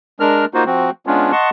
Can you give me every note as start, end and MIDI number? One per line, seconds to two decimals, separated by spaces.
0.20 0.45 56
0.20 0.45 62
0.20 0.45 70
0.20 0.45 89
0.54 0.64 58
0.54 0.64 63
0.54 0.64 65
0.54 0.64 66
0.54 0.64 72
0.66 0.90 53
0.66 0.90 60
0.66 0.90 66
1.07 1.32 56
1.07 1.32 59
1.07 1.32 61
1.07 1.32 62
1.07 1.32 65
1.32 1.50 75
1.32 1.50 78
1.32 1.50 81
1.32 1.50 84
1.32 1.50 85